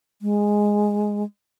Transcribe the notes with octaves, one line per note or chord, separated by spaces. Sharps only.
G#3